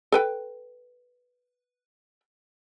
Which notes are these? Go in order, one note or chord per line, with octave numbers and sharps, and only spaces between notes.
A4 B4 G5